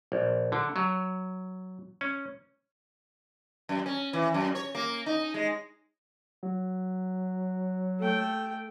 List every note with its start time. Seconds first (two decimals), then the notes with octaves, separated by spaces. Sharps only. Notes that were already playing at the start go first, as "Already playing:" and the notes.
0.12 A#1
0.52 D3
0.76 F#3
2.01 C#4
3.69 F#2
3.86 C#4
4.13 E3
4.34 F#2
4.55 C#5
4.75 A#3
5.06 D#4
5.34 G#3
6.43 F#3
8.00 A3 G5